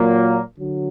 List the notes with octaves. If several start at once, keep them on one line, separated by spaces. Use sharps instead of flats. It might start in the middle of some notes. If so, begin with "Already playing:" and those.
Already playing: A#2 F#3 A#3
D3 F#3